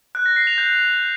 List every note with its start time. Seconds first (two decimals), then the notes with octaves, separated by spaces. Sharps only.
0.15 F#6
0.26 A#6
0.36 C7
0.47 F7
0.58 G6